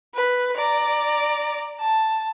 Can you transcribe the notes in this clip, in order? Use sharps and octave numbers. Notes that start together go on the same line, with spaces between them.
B4
D5 A#5
A5